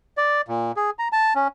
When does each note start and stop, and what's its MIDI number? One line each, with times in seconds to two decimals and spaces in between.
0.17 0.41 74
0.48 0.72 46
0.77 0.90 68
0.99 1.08 82
1.12 1.33 81
1.35 1.48 61